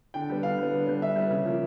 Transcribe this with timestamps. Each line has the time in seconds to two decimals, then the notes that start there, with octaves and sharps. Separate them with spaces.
0.14 D3 G5
0.30 G3 B3
0.43 D3 F5
0.58 G3 B3
0.73 D3
0.87 G3 B3
1.01 D3 E5
1.16 G3 B3
1.31 C#3
1.45 F3 A#3